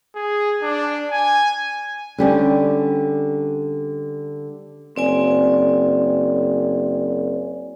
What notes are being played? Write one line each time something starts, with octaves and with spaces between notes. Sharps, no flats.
G#4
D4
G#5
D3 G3 C#4
F#1 C4 D5 G#5